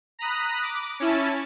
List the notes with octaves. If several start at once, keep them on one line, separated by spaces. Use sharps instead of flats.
A#5 B5 D#6 F#6
D6
C#4 E4 A5